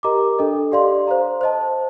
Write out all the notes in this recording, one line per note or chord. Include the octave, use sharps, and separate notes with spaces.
G4 A#4 D#5 A#5 D6
D4 A4 D#5
G4 D5 F5 C6
C5 F5 A#5
C5 D#5 A5